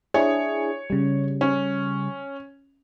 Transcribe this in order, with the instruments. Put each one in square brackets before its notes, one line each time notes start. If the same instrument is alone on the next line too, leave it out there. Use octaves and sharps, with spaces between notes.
[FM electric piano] D4 E4 G#4 [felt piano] C#5
[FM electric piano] C#3 G3
[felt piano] C#4